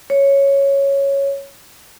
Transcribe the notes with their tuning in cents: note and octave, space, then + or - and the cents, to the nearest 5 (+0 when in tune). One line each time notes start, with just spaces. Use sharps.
C#5 +0